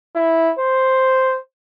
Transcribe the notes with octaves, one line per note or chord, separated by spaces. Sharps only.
E4
C5